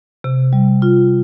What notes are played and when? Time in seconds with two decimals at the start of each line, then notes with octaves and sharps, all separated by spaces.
0.24 C3
0.53 G3
0.82 F4